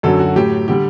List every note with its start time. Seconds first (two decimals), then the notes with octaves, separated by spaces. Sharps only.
0.03 F#2 D3 F#3 A4
0.20 F#4
0.36 A2 F#3 G4
0.68 D3 G3 G4